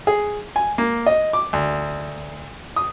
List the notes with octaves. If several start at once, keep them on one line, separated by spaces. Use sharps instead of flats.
G#4
G#5
A#3
D#5
D6
D2
D#6